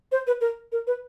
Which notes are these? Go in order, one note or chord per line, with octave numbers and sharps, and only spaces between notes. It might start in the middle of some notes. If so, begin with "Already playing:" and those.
C5
B4
A#4
A#4
B4